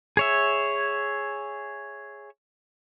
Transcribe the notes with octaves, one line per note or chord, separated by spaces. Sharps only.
G#4 C#5 E5